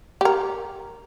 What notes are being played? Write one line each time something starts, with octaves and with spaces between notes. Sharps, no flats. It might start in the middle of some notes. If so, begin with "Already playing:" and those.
G4 A#4